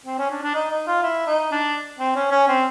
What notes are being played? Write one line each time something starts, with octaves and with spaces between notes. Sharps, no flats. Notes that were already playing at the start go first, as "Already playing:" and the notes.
C4
C#4
D4
D4
D#4
D#4
F4
E4
D#4
D4
C4
C#4
C#4
C4